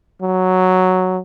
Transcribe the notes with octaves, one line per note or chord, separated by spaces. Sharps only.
F#3